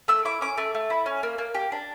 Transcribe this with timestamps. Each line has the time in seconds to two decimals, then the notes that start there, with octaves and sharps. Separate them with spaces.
0.08 A3 E6
0.25 E4 D6
0.41 C#4 D6
0.57 A3
0.75 A3
0.90 E4
1.06 C#4
1.23 A#3
1.38 A#3
1.55 G4
1.72 D4